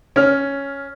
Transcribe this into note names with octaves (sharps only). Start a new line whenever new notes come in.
C#4 F6